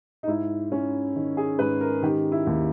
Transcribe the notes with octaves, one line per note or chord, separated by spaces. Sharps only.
D#4
G#2 E4
C#4
D#3
G#4
G#2 B4
A#4
D#3 G4
E4
D#2